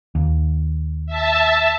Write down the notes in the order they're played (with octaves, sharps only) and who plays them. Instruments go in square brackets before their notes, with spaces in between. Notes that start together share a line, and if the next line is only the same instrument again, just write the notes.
[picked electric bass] D#2
[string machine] E5 A5